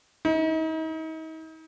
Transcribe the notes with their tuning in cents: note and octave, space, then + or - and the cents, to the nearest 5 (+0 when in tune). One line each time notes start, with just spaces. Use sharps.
D#4 +40